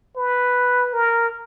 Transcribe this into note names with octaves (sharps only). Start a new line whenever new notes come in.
B4
A#4